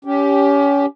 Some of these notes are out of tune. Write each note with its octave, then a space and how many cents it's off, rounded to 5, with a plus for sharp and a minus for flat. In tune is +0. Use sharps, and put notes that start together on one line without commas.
C#4 +30 G4 +0